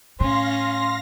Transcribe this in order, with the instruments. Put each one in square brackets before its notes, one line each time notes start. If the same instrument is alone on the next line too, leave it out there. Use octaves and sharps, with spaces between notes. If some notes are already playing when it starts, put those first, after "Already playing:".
[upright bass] A2 [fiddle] C#4 [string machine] F5 A#6 [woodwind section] C6